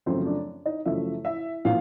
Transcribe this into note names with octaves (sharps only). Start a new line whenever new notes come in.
F#2 C#3 F3 A3 C4 C5
D4 D5
D#4 D#5
F#2 C#3 F3 A3 E4 E5
E4 E5
A#2 F3 F4 F5